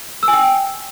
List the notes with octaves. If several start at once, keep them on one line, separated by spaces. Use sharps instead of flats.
E6
G#5
G5